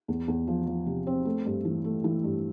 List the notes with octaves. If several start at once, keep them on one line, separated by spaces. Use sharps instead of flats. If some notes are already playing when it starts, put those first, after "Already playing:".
E2
E2
F3
F3
C3
C4
A3
G2
E3
A3
E3
G2